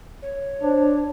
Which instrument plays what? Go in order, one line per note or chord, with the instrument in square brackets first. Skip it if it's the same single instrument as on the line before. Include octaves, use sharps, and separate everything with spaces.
[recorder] C#5
[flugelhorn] D4 [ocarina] C5